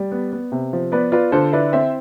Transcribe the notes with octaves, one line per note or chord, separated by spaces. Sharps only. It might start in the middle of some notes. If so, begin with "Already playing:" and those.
Already playing: G3 D5
B3
B3
C3
F3
B3 B4 D5
F4 B4 D5
D3 A4 C5
E4 B4 D5
C4 C5 E5